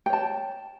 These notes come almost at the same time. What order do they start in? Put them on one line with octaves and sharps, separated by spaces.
G5 C#5 A5